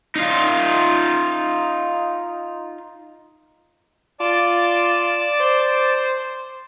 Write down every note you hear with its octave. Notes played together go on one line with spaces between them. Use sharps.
D#4 F4
F4 D5 A5 D6
C5